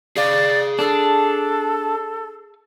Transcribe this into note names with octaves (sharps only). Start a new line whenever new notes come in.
G#4 D5 F5
D4 A4